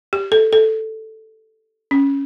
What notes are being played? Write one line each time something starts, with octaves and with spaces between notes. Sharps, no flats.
G4
A4
A4
C#4